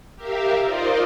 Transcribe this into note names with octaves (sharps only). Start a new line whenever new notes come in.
G4 A#4 E5 F5
D#4 F4 A#4 C5 D5 D#5